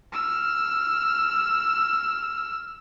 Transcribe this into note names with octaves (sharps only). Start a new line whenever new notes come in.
E6 F6